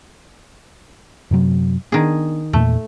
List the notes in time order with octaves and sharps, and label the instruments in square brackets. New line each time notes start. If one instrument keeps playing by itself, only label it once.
[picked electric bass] F#2 C3 F#3
[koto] D#3 G#4 [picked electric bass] B3 D4
[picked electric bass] E2 A#2 [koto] A3